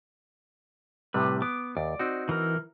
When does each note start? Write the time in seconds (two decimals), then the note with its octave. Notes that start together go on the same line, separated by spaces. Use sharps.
1.14 A2 C3 G3 B4
1.42 B3 D6
1.77 D#2 D5
1.99 C4 D#4 F#4
2.29 E3 A#4